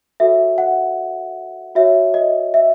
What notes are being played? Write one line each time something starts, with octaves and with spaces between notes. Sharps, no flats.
F#4 A4 C#5 E5
F#5
F#4 C#5 E5
D#5
E5